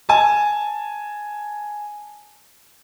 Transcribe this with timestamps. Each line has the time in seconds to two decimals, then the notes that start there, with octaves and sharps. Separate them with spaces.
0.09 G#5 A5